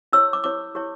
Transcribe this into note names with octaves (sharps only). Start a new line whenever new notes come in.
E4 G4 C#5 E6
D6
E4 G4 C#5 D6
E4 G4 C#5